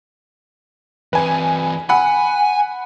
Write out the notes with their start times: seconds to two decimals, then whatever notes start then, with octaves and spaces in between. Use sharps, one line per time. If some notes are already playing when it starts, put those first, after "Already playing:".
1.13 E3 C4 B4 G#5
1.89 F#5 G#5 B5